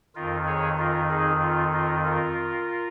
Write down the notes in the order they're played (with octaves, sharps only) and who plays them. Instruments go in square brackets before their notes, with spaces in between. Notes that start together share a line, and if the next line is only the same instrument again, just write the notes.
[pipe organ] F2 D#3 F4 A#4
G#4 C#5
F4 A#4
D#4 G#4
F4
F4 A#4
F4 A#4